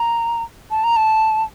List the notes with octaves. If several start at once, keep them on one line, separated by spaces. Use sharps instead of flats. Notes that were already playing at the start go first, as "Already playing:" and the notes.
Already playing: A#5
A5
A#5
A5